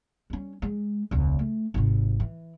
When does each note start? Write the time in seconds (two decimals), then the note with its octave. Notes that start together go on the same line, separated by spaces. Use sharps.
0.30 G3 C#4
0.62 G#3
1.11 E1 C#2
1.39 A3
1.74 G#1 C3
2.20 E3